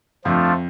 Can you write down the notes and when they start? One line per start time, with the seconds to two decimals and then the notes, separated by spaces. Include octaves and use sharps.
0.24 F2 F3 A3 D4 F4